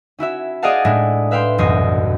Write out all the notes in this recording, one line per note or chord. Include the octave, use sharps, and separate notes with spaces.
C#4 E4 F#4 E5
G#4 D5 D#5 F5 F#5 A5
A2 G#3 D4 E4
B4 E5 F5 G5 C6
E1 C2 F#2 D#5 C#6 C7